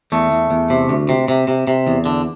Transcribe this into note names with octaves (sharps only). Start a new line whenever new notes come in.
E2 A3
E2
E2
C3
D2
C3
C3
C3
C3
E2
D3